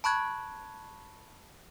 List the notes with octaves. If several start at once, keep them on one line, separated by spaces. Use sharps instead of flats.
A5 B5 C#6 F#6 G#6